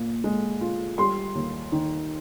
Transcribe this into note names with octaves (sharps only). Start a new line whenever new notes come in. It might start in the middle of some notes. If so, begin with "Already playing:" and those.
Already playing: A#2
G#3
F4
G3 C6
D#2
D#3